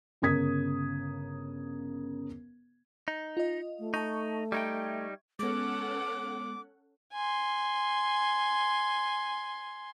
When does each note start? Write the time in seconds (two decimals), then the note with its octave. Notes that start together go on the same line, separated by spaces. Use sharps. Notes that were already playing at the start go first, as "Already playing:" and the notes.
0.22 G1 C#3 A#4 D#6 G#6 B6
3.08 D#4
3.37 F4 D#5
3.79 A3
3.94 D#4 A5 C#6
4.52 G3 D#4 E5 G5 C#6 G#6
5.39 G#3 B3 C#4 A4 F#5 D6
7.13 G#5 C6